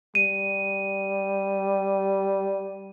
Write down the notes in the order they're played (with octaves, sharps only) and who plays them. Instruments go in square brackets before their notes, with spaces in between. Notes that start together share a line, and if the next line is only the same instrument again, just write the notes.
[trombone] G3 [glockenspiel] D#7